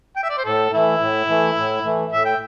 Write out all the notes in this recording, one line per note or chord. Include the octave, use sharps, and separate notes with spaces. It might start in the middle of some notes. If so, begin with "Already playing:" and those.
G5
E5
D5
C5
A2 A4
E3 A3 E4
A2
E3 A3
A2
E3 A3
A2 E5
G5